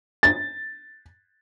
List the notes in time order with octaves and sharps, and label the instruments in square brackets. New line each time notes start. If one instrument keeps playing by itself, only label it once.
[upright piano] A6